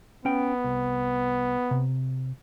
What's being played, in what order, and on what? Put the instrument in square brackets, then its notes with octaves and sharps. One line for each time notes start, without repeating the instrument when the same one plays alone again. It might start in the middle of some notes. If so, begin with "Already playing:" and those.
[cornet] B3 [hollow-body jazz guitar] C#4 G5
[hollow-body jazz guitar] C2
C3